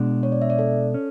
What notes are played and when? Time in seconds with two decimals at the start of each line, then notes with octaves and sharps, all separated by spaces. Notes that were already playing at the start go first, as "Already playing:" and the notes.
Already playing: B2 G#3 D4
0.23 C#5
0.32 D5
0.42 E5
0.50 D5
0.59 A4
0.94 C#4